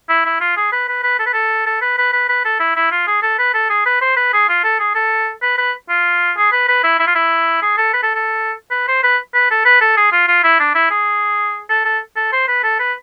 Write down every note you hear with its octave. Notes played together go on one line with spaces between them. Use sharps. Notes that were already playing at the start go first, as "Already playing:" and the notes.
E4
E4
F4
G#4
B4
B4
B4
A4
B4
A4
A4
B4
B4
B4
B4
A4
E4
E4
F4
G#4
A4
B4
A4
G#4
B4
C5
B4
G#4
F4
A4
G#4
A4
B4
B4
F4
G#4
B4
B4
E4
E4
F4
E4
G#4
A4
B4
A4
A4
B4
C5
B4
B4
A4
B4
A4
G#4
F4
F4
E4
D4
E4
G#4
A4
A4
A4
C5
B4
A4
B4